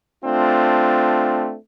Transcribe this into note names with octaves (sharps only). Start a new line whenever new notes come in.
A3 C4 D4 F4